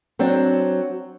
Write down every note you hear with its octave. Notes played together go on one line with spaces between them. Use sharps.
F#3 C4 D4